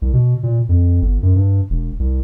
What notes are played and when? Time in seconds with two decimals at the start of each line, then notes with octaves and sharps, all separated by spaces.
0.02 C2
0.13 B2
0.43 A#2
0.69 F2
1.02 G1
1.22 F#2
1.36 G2
1.70 E1
1.99 C2